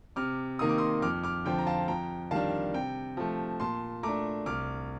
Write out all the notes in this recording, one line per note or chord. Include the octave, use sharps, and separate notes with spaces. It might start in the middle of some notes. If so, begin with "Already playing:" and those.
C3 D6 F6
D#3 A#3 D#4 D#6
D6
C6 D#6
F2 D6 F6
D6 F6
D3 F3 C4 G5
A#5
F5 A5
F2 G5 A#5
D#3 G3 D4 F5 A5
C3 G5
F3 A3
A#2 A5 C6
A3 D4 A#5 D6
C2 D6 F6